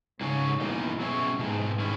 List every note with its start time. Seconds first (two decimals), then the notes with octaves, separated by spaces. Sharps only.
0.21 G#2 C#3 F#3 C#4 G#4 C#5
0.60 F#2 B2 E3 A#3 D#4
1.00 F#3 C#4 E4 G#4 C#5
1.39 G#2 B2 G#3 D#4
1.80 D#3 G#3 C#4 E4